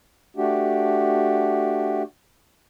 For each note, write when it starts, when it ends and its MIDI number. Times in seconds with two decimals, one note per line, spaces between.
0.37 2.03 57
0.37 2.03 62
0.37 2.03 66
0.37 2.03 67